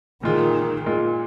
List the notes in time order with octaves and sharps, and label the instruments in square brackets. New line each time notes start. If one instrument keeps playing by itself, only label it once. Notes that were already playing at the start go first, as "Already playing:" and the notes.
[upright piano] A#2 G#3 F4 [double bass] D#3
[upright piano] A#2 G#3 F4